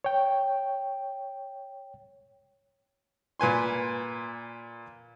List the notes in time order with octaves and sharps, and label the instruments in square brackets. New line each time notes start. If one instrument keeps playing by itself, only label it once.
[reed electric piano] C#5 G5
[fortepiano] A#2 B4 G#5 C6